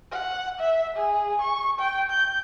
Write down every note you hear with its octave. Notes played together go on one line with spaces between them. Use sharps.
F#5
E5
G#4
C#6
G5
G6